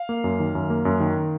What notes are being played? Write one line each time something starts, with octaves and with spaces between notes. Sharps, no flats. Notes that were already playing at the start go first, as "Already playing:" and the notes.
Already playing: F5
A#3
F#2
D#3
F#2
A#3
F#2
D#3